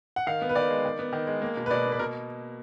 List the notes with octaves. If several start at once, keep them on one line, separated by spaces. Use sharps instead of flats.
F#5
D#3 F5
B3
B4
D#3 D5
G#3
D#3
B3
D#3
G#3
A#3
B2
B4
B2 D5
A#3
B4
B2 A#4